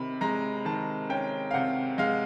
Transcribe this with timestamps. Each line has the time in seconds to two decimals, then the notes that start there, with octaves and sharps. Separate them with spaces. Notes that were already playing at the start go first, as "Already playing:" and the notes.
Already playing: C3 D#3 B5
0.21 G#3 A#5
0.65 D#3 A5
1.10 C#4 G5
1.51 F5
1.54 C3 F#5
1.98 G#3 F5